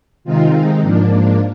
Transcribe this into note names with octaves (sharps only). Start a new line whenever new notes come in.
C3 D#3 G#3 C4 D#4 F4
G#2 F3 A#3 D4